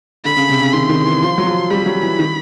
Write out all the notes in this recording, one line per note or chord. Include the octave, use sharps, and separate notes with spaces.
D3 B5
C#3
C3
C#3
D#3 C6
D#3
E3
F3
F#3
F3
G3 B5
F#3
E3
D#3